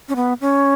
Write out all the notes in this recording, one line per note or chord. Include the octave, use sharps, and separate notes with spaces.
C#4
B3
C#4